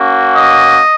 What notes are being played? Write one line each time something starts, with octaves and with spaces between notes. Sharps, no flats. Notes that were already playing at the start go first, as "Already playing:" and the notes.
Already playing: A#3 C#4 F#4
D#5